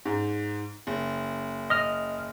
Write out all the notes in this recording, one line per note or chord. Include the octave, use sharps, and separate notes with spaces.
G#2
F#1
D#5 F6